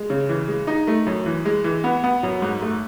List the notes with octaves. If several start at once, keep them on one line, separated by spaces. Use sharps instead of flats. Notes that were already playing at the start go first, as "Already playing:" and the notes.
Already playing: G#3
C#3
E3
G#3
D#4
A3
F#2
E3
G#3
E3
B3
B3
F#2
G#2
A3